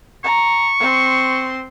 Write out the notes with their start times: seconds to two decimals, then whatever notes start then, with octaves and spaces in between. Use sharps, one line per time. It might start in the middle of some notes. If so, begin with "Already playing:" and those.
0.24 A#5 C#6
0.80 C4 C6